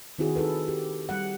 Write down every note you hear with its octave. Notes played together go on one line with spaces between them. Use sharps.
D#3 C4 E4 F#4 G#4
D#4 G#4 A4 B4
G4
G3 F#5